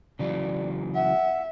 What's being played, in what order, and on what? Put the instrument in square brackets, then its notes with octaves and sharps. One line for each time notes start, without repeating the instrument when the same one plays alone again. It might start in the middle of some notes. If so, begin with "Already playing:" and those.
[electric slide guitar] C#3 E3 F#3 [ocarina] D5
[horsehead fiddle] E5 [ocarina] F#5